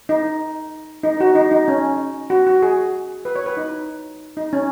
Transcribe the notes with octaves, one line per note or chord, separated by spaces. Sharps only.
D#4
D#4
F#4
D#4
D#4
C#4
F#4
F#4
G#4
B4
C#5
B4
D#4
D#4
C#4